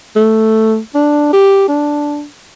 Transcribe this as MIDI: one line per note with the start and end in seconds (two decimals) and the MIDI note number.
0.16 0.78 57
0.95 1.31 62
1.33 1.67 67
1.68 2.25 62